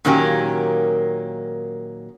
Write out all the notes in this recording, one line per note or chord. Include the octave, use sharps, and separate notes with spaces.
A#2 D#3 F#3 A#3 C#4 G4